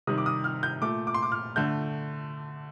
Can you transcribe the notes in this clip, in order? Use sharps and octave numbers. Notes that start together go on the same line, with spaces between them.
C3 D#3 G3 D#6
D6
D#6
F6
G6
A#2 A3 D6
D6
C6
D6
F6
D3 A3 G6